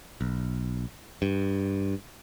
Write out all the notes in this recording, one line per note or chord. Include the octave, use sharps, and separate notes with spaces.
B1
G2